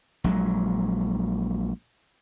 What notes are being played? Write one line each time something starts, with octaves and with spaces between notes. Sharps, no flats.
A#1 F#3 G#3